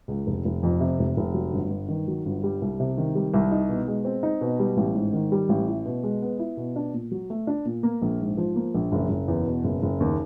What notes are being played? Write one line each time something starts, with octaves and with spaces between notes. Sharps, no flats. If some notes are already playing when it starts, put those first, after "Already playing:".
C#2
F1
F1
F2
C3
F1
F1
F#3
G1
G2
D#3
F#3
G1
G3
C2
C3
D#3
G3
C2
D#4
B2
G#3
C4
D#4
B2
G3
A1
G#2
D#3
G3
A1
E4
B2
G#3
B3
E4
B2
D4
A#2
F#3
A3
D4
A#2
A#3
A#1
G#2
F3
A#3
A#1
F#1
F#1
E2
B2
F#1
F#1
D#2